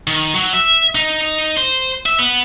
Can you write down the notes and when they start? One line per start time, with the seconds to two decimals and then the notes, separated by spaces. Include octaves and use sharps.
0.07 D#3
0.34 F#3
0.53 E5
0.95 D#4
1.57 C5
2.06 E5
2.19 B3